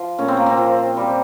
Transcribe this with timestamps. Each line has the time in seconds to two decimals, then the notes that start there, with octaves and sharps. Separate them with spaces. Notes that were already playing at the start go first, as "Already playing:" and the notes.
Already playing: F3
0.18 A#2 C#4
0.28 C4
0.37 A#3
0.46 C4
0.58 F3
0.97 G3